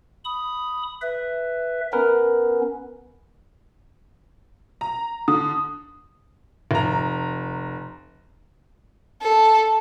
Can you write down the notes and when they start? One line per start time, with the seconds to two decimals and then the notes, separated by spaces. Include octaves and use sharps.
0.25 B5 D#6
1.01 B4 E5
1.93 B3 C#4 A#4 B4
4.81 A#5
5.28 D3 D#6
6.71 F1 A#5
9.22 A4